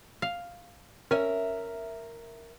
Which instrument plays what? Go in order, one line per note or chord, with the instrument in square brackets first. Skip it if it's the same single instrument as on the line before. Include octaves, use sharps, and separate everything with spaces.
[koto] F5
[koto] C#4 G#5 [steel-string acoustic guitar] A#4 E5